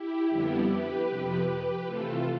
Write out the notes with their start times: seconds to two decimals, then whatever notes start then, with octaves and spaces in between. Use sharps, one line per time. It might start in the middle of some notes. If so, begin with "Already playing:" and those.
Already playing: E4 G4
0.31 F2 D3 G3 B3 E4 G4
0.69 G4 B4
1.09 F2 C3 F3
1.46 G4 B4
1.85 C3 E3 A3 F4 A4